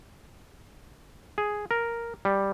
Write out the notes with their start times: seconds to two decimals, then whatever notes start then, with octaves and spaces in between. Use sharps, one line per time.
1.38 G#4
1.71 A#4
2.25 G3